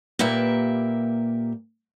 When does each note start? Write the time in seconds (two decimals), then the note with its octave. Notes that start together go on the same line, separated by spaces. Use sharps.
0.19 A#2 A#3 G4 B4 E5